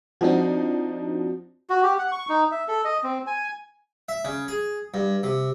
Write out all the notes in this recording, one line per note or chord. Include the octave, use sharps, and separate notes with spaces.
F3 C4 D4 D#4 F#4
F#4
G4
F#5
C#6
D#4
E5
A4
D#5
C4
G#5
E5
C#3
G#4
G2
C3